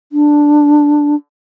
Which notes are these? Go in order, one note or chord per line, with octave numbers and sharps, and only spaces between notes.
D4